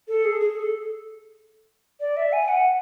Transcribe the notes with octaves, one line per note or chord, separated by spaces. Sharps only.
A4
G#4
G#4
A4
D5
E5
G#5
F#5